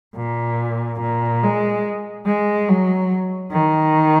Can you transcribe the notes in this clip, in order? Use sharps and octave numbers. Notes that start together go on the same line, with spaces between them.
A#2
A#2
G#3
G#3
F#3
D#3